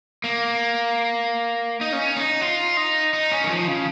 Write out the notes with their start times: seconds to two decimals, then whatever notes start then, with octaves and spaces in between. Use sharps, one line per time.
0.24 A#3
1.81 D#4
1.93 C#4
2.16 D#4
2.41 F4
2.77 D#4
3.14 D#4
3.32 C#4
3.44 D#3
3.50 F3
3.67 C#3